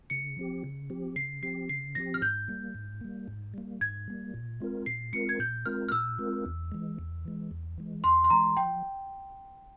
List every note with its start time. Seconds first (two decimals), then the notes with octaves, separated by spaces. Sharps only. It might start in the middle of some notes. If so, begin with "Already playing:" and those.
0.10 C#3 C#7
0.37 F3 C4 G4
0.64 C#3
0.90 F3 C4 G4
1.16 C#3 C7
1.43 F3 C4 G4 C7
1.69 C#3 C7
1.95 F3 C4 G4 A#6
2.14 F6
2.21 G#2 G6
2.48 G3 A#3
2.74 G#2
3.01 G3 A#3
3.28 G#2
3.54 G3 A#3
3.81 G#2 G#6
4.08 G3 A#3
4.34 A#2
4.60 G#3 C4 F4 A#4
4.86 A#2 C7
5.13 G#3 C4 F4 A#4 C#7
5.29 G#6
5.39 A#2 G6
5.66 G#3 C4 F4 A#4 F6
5.89 F6
5.92 A#2 E6
6.18 G#3 C4 F4 A#4
6.46 E2
6.72 E3 G#3
6.99 E2
7.25 E3 G#3
7.51 E2
7.78 E3 G#3
8.04 E2 C6
8.24 C6
8.30 E3 G#3 A#5
8.56 F3 G5